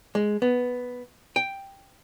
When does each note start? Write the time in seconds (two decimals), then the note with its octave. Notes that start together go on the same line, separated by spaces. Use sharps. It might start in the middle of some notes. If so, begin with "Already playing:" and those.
0.15 G#3
0.42 B3
1.36 G5